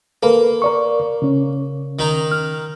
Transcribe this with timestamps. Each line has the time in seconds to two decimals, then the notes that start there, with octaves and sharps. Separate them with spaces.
0.23 A#3 A4 B4
0.62 A#4 D5 C#6
1.22 C#3 C#4
1.99 D#3 D#4 A#5
2.32 F6